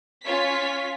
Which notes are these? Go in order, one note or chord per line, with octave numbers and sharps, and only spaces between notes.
C#4 F4 C#5 B6